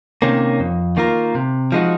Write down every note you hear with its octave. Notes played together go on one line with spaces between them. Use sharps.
C3 D#3 A#3 C#4
F2
D#3 A#3 F4 A#4
C3
F3 G#3 D#4 F#4